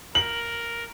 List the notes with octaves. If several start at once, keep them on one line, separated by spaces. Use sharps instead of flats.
A#4 F#7